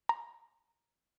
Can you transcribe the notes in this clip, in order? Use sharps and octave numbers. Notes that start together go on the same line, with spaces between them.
A#5